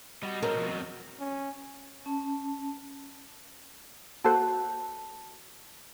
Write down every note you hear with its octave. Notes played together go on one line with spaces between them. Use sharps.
G3 F#4 D#5
G#2 C4 C#4 A#4
B2 F3
E2 F#3
C#4
C#4 A5
A#3 F#4 A4 C5 F#5 A5